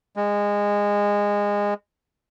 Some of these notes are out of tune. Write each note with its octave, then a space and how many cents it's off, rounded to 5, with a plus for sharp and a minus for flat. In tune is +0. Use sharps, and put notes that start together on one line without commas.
G#3 -20